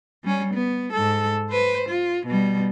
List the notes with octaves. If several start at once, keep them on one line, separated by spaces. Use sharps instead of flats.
G3 C#4
B3
G#2 A4
B4 C5
F4
B2 G3